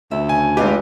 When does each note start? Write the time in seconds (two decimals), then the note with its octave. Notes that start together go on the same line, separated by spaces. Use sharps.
0.11 D2 E5
0.29 C#3 G#5
0.57 G#1 G3 F4 G4 B4 D#5